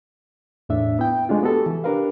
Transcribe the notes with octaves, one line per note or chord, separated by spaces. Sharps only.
E2 A2 D4 E5
B3 E4 G5
G#3 A3 D4 F4
B3 F#4 G4 A4
E3
D4 G4 A#4 B4 F5